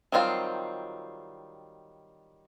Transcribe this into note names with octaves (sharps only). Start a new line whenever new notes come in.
D#3 F#3 G3 C4 F4